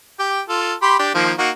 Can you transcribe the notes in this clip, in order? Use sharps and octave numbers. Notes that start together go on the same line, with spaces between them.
G4 G5
F4 A4
G4 B5 C6
D4 G4
D#3 F3 A#3
A#3 D#4 F#4